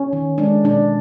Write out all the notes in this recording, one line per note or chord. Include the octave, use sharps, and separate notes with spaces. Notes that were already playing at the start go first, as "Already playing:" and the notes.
Already playing: C#4
D#3
G#3 D4
B2 D4